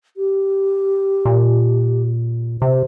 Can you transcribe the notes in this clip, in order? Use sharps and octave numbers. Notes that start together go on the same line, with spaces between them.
G4
A#2
C3 C5